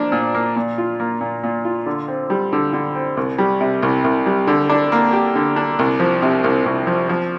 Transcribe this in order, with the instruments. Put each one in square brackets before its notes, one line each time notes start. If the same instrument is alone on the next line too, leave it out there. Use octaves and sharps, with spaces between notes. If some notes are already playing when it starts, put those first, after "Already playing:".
Already playing: [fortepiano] F3 A#3 D4
A#2
A#3
A#2
F4
A#3
A#2
A#2
F4
D3
C4
G3
D3
D3
C4
C2
G3
C3
C2
C2
G3
D3
D4
A#3
G4
D3
D4
C2
F3
C3
C2
C2
F3
F3